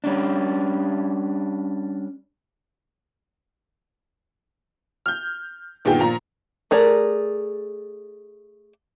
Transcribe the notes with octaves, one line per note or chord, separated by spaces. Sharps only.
G3 C#4 D4
F6 G6
G1 A#2 D#3 B3 G#4 G5
A#2 F3 A#5
A3 G#4 A#4 D5